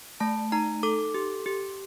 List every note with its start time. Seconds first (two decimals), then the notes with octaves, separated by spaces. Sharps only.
0.20 A3 A5
0.52 D#4 A#5
0.83 A4 D6
1.14 G4
1.46 G4